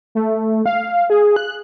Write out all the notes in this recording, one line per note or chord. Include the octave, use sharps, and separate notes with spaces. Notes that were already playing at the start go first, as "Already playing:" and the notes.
A3
F5
G#4
F#6